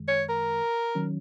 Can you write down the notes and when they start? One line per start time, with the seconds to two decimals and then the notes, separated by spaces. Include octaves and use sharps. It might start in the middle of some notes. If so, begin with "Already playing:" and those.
Already playing: F#2 D#3 G#3
0.08 C#5
0.29 A#4
0.95 D#3 F#3 C#4